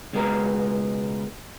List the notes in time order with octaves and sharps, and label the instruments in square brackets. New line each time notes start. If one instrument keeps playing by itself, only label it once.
[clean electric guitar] C#2 B2 G#3 B3 A#4 A#5